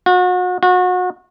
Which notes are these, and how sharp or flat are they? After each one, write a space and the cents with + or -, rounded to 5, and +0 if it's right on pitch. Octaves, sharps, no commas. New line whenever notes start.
F#4 -35
F#4 -30